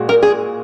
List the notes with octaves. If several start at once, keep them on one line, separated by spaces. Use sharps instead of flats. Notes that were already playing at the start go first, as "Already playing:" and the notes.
Already playing: A#2 G#3 F#4
A#4
G#4